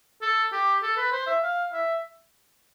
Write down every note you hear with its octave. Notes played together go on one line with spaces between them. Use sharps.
A4
G4
A4
B4
C5
E5
F5
E5